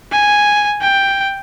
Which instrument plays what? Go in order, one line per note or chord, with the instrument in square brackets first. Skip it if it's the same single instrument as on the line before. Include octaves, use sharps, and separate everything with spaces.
[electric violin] G#5
G5